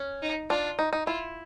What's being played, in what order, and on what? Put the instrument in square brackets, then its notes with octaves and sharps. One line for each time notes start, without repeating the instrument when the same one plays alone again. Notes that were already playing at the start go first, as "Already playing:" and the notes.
Already playing: [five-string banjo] C#4
[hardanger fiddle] D#4
[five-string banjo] D4 [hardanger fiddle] F4
[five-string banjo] D#4
D#4
[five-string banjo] E4 [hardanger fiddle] F4